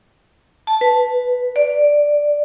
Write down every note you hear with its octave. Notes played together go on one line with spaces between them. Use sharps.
A5
B4
D5